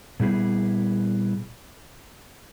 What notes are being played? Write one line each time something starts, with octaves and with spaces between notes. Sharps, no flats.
A#2 G3 B3 E4 G#4